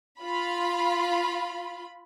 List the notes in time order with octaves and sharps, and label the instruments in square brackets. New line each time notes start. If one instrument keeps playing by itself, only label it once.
[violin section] F4 B5